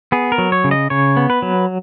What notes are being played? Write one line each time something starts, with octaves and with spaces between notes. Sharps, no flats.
B3 G#4
A#4
F#3
C#5
C#3
D#5
C#3 C#5
B3
B4
F#3